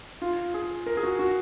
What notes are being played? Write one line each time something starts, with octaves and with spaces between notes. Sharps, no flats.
F4
G#4
A#4
G#4
F#4
F#4